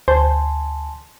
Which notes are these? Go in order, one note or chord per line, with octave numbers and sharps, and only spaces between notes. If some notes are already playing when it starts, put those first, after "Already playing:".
D2 C5 G#5 A5 C6